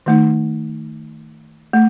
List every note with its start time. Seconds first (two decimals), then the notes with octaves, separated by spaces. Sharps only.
0.06 D#3 A3 D#4
1.73 A3